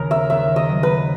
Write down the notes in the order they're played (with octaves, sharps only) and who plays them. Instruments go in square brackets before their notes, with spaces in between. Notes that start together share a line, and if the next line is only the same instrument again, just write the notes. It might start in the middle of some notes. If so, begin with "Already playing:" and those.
Already playing: [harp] D#2 C#3 [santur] A#4
[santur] E5
[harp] D#2 [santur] E5
[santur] D#5
[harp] F#3
[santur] B4